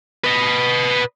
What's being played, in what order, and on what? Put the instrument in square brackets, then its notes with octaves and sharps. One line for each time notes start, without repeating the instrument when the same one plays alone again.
[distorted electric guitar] B4 D#5